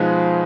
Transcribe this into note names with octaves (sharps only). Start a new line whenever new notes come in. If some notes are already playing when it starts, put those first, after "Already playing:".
Already playing: B2 F3 G#3 D#4 G#4 B4